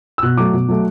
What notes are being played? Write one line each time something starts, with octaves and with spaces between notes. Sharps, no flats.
E6
B2 F#6
F#3 A3 D6
B2
F#3 A3